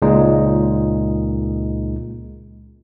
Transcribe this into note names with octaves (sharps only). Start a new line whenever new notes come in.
C#2 A#2 G#3 D#4